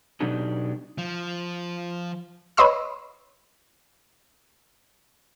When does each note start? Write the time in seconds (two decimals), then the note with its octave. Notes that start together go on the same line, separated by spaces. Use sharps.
0.20 B2 F#3 D4 D#4 G4 A4
0.98 F3
2.57 B4 C#5 D#5 C6 E6